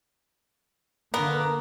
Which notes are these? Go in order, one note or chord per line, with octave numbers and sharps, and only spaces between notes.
D3 A#3 B3 A#4